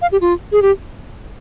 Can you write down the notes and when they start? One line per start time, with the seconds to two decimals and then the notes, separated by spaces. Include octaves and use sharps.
0.02 F5
0.12 G4
0.21 F4
0.52 G#4
0.62 G4